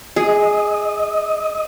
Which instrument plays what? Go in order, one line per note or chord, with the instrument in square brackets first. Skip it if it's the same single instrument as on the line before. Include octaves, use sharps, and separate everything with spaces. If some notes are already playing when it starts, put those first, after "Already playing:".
[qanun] G#4 [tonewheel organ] D#5